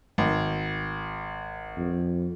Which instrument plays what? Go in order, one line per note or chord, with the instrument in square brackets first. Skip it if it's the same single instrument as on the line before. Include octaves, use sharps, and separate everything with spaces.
[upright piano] G#1
[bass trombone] F2